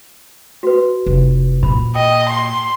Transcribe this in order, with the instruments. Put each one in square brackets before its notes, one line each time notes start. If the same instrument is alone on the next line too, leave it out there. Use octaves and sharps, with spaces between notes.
[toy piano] F#4 B4
[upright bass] F1
[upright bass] A#2 [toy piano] B5
[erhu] D#5 [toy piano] G5
[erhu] C6